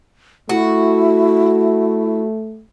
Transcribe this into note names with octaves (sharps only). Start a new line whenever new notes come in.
A3 E4 F#4